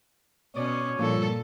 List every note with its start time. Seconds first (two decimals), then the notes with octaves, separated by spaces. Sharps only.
0.56 B2 C#4 C#5 D5 D#6
0.99 G2 A#2 F3 A#3 A4